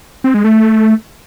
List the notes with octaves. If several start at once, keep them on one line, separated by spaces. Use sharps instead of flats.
C4
G#3
A3